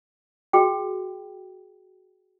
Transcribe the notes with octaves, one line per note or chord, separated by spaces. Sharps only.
F#4 G#4 G5